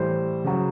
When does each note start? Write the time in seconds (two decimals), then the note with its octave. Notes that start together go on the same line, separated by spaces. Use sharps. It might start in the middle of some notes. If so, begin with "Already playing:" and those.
Already playing: A2 E3 G3 C5
0.44 C#3 F#3